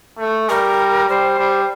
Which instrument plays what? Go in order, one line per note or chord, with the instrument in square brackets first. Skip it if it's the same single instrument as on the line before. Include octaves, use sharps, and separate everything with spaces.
[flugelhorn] A3
[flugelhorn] G3 [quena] A#4
[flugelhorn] G3 [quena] C5
[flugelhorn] G3